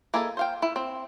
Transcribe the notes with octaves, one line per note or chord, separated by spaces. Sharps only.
A#3 E4 G#4 A4 D#5
C5 F5 G5
E4
C4